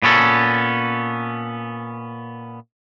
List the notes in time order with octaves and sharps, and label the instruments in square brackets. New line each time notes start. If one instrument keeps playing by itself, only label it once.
[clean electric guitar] A#2 B3 C#4 A4